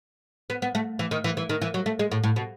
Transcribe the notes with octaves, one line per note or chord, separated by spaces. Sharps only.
B3
B3
A3
E3
D#3
E3
E3
D#3
E3
F#3
A3
G#3
A2
A2
B2